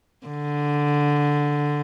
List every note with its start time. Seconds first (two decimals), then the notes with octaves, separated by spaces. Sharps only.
0.26 D3